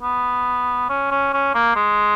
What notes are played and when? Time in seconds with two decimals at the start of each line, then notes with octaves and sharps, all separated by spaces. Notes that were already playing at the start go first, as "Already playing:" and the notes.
0.03 B3
0.90 C#4
1.11 C#4
1.34 C#4
1.55 A#3
1.76 G#3